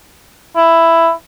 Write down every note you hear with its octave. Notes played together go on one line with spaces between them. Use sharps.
E4